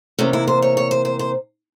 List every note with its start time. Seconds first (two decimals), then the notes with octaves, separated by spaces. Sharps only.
0.19 C3 E3 A#3 C#4
0.33 E4
0.48 C5
0.62 C#5
0.77 C#5
0.91 C5
1.05 C5
1.19 C5